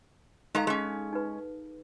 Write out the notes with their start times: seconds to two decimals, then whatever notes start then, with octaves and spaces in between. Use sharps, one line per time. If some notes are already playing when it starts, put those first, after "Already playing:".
0.55 G#3 D#4 A4 F5 A5 A#5
0.67 G#3 C#4 G#4
1.13 D#4 B4